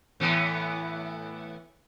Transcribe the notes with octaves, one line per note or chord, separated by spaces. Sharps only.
A2 E3 B3